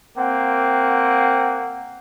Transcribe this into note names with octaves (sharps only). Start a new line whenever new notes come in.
A#3 C4 F#5